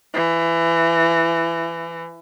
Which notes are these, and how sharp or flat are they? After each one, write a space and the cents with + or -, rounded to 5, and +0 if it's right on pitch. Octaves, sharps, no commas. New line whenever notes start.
E3 +20